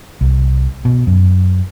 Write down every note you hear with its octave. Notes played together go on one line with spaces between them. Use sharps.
C2
B2
F#2